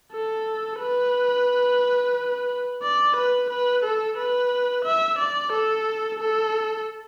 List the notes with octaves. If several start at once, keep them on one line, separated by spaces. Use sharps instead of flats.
A4
B4
D5
B4
B4
A4
B4
E5
D5
A4
A4